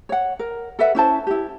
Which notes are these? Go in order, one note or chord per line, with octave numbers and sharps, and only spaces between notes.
C#5 F#5
A#4
A4 B4 E5 F#5
C#4 E4 C5 A5
E4 G4